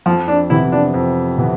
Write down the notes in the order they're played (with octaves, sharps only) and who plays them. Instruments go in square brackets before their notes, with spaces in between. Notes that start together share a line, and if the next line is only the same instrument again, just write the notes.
[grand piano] F2 [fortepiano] F3
[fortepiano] D4
[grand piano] C3 E3 B3 [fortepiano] E4
[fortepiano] D4
[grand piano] F2
C3 E3 B3